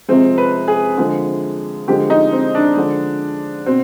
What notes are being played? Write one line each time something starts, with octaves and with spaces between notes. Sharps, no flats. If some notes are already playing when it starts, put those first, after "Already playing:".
C3 F3 G#3 C4
B4
G#4
D3 F3 G#3
D3 F3 G#3 G4
D#4
C4
D4
D3 F3 G#3
B2 C4